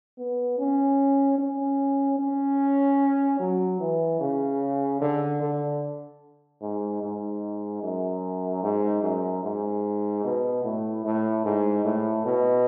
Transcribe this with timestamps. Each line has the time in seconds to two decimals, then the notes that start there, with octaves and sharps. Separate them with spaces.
0.18 B3
0.58 C#4
1.39 C#4
2.19 C#4
3.40 F#3
3.80 E3
4.21 C#3
5.01 D3
5.42 D3
6.62 G#2
7.02 G#2
7.83 F#2
8.63 G#2
9.03 F#2
9.43 G#2
10.24 B2
10.64 A2
11.05 A2
11.45 G#2
11.85 A2
12.25 B2